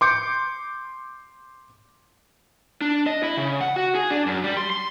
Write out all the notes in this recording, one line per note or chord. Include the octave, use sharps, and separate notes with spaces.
C6 D6 G6 C#7
D4
D#5
E4
C#3
F#5
F#4
G#4
D4
F#2
G3
C6
C6